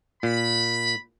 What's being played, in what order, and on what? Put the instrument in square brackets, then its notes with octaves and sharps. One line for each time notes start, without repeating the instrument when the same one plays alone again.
[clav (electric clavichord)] A#2 [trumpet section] B5